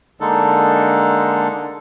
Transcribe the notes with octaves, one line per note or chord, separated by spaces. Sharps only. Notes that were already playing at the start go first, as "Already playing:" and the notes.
D3 G#3 A#3 D4 D#4 A4